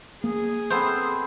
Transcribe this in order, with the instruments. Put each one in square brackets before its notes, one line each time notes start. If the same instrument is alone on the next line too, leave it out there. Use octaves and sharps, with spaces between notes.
[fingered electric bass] A#3 [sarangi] G#4
[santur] A3 B3 C4 [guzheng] C5